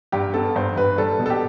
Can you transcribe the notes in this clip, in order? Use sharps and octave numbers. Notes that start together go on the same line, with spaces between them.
G2 G4
B3 A4
G2 C5
G2 B4
G3 A4
B2
A4
G4